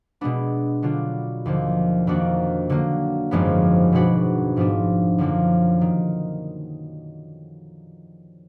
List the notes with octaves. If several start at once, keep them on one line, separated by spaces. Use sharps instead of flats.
B2 G#3 B3 D4
D3 F#3 D4 F4
D#2 D3 F3
F2 D#3 A#3 D4 F#4
D3 F#3 A#3
G#1 F#2 F3 G#3 B3
B2 G#3 D4 F#4 B4
G#2 F3 B3 D4
F#2 D3 F3 A#3
D#3